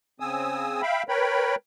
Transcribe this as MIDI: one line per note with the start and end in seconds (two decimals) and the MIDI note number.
0.20 0.82 49
0.20 0.82 60
0.20 0.82 80
0.20 0.82 87
0.20 0.82 88
0.82 1.03 76
0.82 1.03 77
0.82 1.03 79
0.82 1.03 83
1.09 1.55 70
1.09 1.55 71
1.09 1.55 73
1.09 1.55 79
1.09 1.55 83